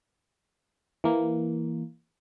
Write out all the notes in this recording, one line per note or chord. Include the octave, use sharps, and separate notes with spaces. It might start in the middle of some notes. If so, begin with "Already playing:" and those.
E3 A#3